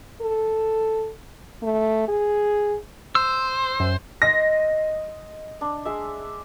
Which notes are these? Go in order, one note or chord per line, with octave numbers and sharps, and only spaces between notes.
A4
A3
G#4
C5 E6
F#2
D#5 C6 A#6
D4
G#3 E5